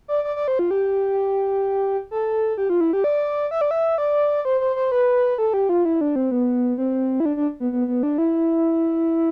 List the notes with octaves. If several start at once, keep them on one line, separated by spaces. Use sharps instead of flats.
D5
D5
D5
C5
F4
G4
A4
G4
F4
E4
G4
D5
E5
D5
E5
D5
C5
C5
C5
B4
A4
G4
F4
E4
D4
C4
B3
C4
E4
D4
D4
B3
B3
B3
D4
E4